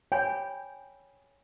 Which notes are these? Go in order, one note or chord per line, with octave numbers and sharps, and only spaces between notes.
C#5 G5 G#5 B5